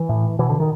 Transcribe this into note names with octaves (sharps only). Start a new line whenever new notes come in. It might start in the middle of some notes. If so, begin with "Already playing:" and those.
Already playing: E3
A2
B2 E3
D3
D#3